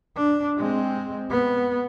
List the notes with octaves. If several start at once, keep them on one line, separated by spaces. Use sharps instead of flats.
D4
G#3 C4
B3